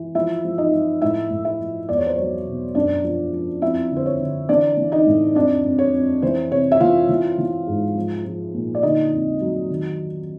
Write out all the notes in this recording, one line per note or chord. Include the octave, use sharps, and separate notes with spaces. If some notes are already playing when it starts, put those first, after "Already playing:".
Already playing: E3
F3 E4 E5
F3
D#4 D#5
F3
A2 E4 E5
A2
E4 E5
F3
E2 D5
C#5
C5
F#3 C#5
B2
F#2 D4 D5
F3
F3
F2 E4 E5
D3
C5
C#5
D3
E3 D4 D5
E3
D#4 D#5
A2
F2 D4 D5
F2
C#5
F2
E3 C5
C3 C#5
E5
E3 F4 F5
E3
E3
G#2
F3
F3
A#2
D5
D3 D#4 D#5
F2
F#3
D#3